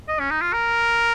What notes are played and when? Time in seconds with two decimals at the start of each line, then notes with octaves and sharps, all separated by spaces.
0.09 D#5
0.19 C#4
0.31 D#4
0.42 F4
0.53 A#4